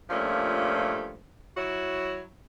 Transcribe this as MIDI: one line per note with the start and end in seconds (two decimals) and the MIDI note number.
0.10 1.17 43
0.10 1.17 46
0.10 1.17 53
0.10 1.17 57
0.10 1.17 61
1.57 2.24 54
1.57 2.24 64
1.57 2.24 66
1.57 2.24 73